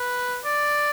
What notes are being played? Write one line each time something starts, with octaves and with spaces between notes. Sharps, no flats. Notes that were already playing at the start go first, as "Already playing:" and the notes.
Already playing: B4
D5